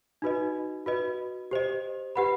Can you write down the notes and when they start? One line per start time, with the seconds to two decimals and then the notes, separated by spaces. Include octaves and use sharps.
0.22 D#4 F#4 B4 D#5
0.86 F#4 B4 D#5
1.51 G4 C5 D#5
2.16 G4 B4 F#5 B5